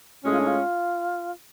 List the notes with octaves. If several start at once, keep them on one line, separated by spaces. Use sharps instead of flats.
A2 G#3 C#4 F#4
F4
D4
F4